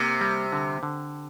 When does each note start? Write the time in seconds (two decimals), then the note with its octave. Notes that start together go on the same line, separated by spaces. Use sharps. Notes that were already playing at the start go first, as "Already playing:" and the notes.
Already playing: C3 A#3
0.21 G3
0.52 D3
0.83 D3